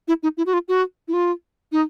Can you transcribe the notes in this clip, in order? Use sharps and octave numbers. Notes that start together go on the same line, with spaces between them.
E4
D#4
E4
F#4
F4
F#4
E4
F4
D#4